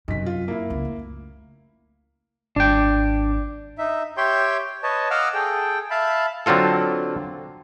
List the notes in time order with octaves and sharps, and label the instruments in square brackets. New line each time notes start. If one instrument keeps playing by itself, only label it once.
[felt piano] B1 B6 [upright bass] F#2 C3
[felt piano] F4
A#3 E4
[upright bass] C#2
A3
[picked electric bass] G#1 [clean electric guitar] D4 G5
[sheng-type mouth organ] D#4 E5
G4 C#5 E5 G5 C6 G6
B4 C#5 D#5 A5
D#5 F5 F#5 D6 E6 F6
G#4 A4 G5
E5 F5 A5 B5
[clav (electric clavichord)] D3 F#3 C4 F4 A4